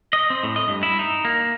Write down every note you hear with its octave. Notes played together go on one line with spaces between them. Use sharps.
D#5
C4
A2
D#5
G2
E4
D#4
A#3